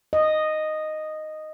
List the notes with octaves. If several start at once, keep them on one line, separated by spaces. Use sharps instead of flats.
D#5